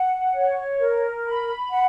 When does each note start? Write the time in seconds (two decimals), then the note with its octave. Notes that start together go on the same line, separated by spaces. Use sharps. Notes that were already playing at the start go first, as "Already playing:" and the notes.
Already playing: F#5
0.33 C#5
0.79 A#4
1.25 B5
1.71 F#5